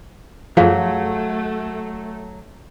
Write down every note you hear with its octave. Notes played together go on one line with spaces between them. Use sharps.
F#2 F3 F#3 A3 G#4 F5 A5